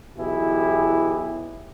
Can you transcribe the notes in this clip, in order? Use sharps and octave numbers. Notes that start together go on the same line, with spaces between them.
B1 B2 E3 E4 G4 G#4